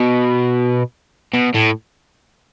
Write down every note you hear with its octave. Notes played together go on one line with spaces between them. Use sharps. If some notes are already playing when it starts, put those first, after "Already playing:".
Already playing: B2
B2
A2